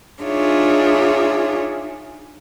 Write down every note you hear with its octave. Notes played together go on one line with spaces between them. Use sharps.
D4 D#4 F4 G#4 C#5 E5